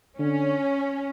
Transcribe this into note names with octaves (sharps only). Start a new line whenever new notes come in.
D3 C#4